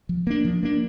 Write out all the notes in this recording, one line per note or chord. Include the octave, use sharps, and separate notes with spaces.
F3
A#3 D4
F3
A#3 D4